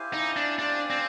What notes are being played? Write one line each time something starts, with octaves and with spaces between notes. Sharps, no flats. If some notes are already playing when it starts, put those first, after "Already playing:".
Already playing: E4 G4 C5 F5 G#5
D#4
D4
D4 G4 C5 F5 G#5
C4